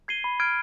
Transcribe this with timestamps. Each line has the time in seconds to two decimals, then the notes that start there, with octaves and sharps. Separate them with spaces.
0.08 G#6 C7 D#7 G7
0.24 B5
0.40 F6 G#6 D7